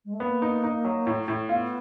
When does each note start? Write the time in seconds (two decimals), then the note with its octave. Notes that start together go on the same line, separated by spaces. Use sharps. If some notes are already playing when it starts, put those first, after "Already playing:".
0.05 G#3
0.13 A3
0.20 A#3 B3
0.42 D#4
0.64 D#4
0.85 F#3
1.07 A2
1.28 A2
1.48 B3 F4